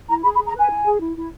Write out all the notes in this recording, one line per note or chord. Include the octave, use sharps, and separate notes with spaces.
E4 A#5
G#4 B5
B5
G#4
A#5
B4 G#5
E4
G#4
E4
E4